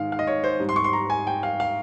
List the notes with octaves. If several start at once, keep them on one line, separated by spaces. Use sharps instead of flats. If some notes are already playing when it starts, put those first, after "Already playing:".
Already playing: G#2 D#3 G#3 F5
F5
D#5
C#5
C5
G#2 G3
C6
C#6
C6
A#5
G#5
G5
F5
F5